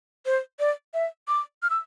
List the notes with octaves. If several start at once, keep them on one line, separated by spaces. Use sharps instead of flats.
C5
D5
E5
D6
F6
E6